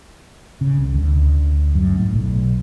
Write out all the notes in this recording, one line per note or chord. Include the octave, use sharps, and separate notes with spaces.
C#3
C2
D2
F#2
A2
B1